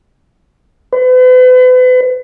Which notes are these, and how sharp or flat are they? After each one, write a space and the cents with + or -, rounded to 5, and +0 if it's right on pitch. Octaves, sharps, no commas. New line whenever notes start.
B4 +40